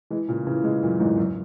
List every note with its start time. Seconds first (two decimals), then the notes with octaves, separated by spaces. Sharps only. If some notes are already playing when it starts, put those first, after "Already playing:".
0.10 E3 G#3
0.28 A#2 C#3
0.47 C#3 E3
0.64 E3 G#3
0.82 F#2 A#2
1.00 E2 G#2
1.18 F#2